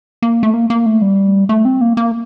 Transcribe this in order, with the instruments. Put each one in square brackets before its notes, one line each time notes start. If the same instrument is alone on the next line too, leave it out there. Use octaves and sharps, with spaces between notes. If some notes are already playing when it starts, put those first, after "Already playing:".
[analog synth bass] A#3
A3
A#3
A#3
A3
G3
A3
C4
A#3
A#3